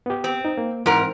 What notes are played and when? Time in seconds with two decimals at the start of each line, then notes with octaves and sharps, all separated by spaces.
0.06 B3 G4
0.24 C4
0.45 D#4
0.58 A#3
0.86 G#2 E3 C4 A#4